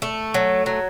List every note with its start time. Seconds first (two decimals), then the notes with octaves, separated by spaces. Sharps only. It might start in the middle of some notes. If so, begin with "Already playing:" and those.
0.02 A3
0.34 F#3
0.66 F#3